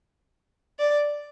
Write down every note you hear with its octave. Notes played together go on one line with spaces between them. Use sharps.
D5